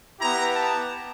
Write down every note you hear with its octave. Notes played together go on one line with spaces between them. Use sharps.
B3 E4 G4 A#5
A5